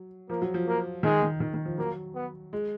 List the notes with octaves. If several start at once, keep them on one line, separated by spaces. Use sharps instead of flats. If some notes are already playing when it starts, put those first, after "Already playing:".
Already playing: F#3
F3 A#3
F#3
F3
A#3
D#3 G#3
D#3
D#3
D#3
F3
F#3 A#3
B3
G#3